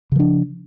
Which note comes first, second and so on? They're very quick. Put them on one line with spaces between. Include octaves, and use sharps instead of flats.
C#3 F3 D4